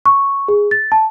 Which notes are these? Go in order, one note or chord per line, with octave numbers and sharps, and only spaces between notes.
C#6
G#4
A6
A5